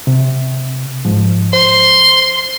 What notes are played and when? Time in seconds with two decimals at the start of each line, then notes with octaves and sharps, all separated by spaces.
0.07 C3
1.05 G#2 F3
1.53 C5 C6